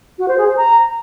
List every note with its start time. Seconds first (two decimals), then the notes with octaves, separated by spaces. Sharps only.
0.19 F#4
0.28 C5
0.38 G#4
0.47 C5
0.57 A#5